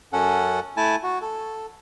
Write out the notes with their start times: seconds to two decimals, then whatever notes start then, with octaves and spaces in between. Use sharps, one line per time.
0.13 F#2 C#4 A4 F#5
0.77 A3 E4 G#5 A5
1.03 F#4
1.22 A4